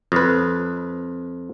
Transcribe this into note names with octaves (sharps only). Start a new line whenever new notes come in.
F2 B4